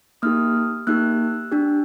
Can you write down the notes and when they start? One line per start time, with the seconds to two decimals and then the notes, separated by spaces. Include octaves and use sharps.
0.22 A#3 D#4 G4 D#6 F6
0.87 A#3 D#4 G4 E6 F#6
1.52 D4 G4